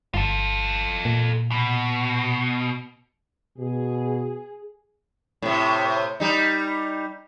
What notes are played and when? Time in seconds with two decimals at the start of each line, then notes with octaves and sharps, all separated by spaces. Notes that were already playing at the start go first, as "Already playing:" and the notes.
0.14 G1 F4 A4
1.05 A#2
1.51 B2
3.58 B2 G#4
5.42 A2 C3
6.20 G3 D#4